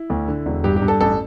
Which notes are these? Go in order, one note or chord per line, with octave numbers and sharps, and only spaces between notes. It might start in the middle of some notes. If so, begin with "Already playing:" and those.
Already playing: E4
D2
D3
E1
G2 G4
G4
G2
A4
A1 A4